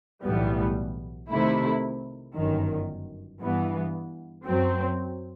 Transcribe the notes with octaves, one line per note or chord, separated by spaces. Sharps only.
B1 A2 E3 G3 B3
C3 D#3 A3 E4
G1 F#2 D#3
G2 E3 B3
F#2 F#3 C4